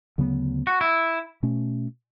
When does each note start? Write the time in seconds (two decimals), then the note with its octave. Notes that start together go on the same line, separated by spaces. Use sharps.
0.18 D2 C#3 F#3 B3
0.67 F#4
0.81 E4
1.43 B2 A3 C#4